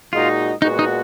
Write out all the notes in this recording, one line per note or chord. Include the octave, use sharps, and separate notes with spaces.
A#2 G#3 D#4 F4 F#4
A#2 G#3 B3 D#4 F#4
D#4